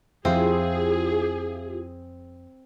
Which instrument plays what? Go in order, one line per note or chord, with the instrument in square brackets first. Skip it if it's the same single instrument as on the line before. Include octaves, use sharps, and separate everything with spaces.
[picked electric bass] F2 F3 [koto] C4 [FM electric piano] E4 F4 G4 [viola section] G#4